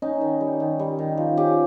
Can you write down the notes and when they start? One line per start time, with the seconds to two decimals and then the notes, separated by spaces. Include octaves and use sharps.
0.02 C#4 D#4
0.21 D#3
0.41 G3
0.60 D#3
0.79 G3
0.99 D#3
1.17 F3
1.37 C#4 G4